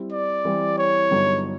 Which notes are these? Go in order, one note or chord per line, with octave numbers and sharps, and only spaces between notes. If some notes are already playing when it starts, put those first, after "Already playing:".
Already playing: G3 C4 E4
D5
E3 G3 C4
C#5
G2 D3 F#3 B3 D#4